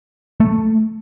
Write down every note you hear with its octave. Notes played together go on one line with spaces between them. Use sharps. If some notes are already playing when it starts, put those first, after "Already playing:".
A3